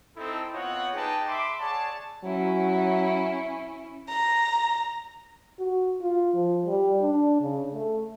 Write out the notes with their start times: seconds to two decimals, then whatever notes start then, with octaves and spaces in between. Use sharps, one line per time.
0.16 C4 D#4 E4 A4
0.54 B3 C4 F4 C#5 D#5 F#5
0.94 D#4 G4 G#4 B4 G5 A5
1.27 E5 B5 C6 D6
1.60 G#4 C#5 D5 F#5 A5
2.25 F#3 C#4 E4
4.09 A#5
5.59 F#4
6.02 F4
6.34 F3
6.66 G3
7.01 D4
7.40 C#3
7.73 A3